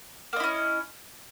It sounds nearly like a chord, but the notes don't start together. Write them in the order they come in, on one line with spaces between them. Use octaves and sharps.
A#3 D#5 E4 C#4